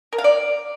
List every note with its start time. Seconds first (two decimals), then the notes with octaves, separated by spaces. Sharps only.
0.13 A#4
0.18 F5
0.24 D5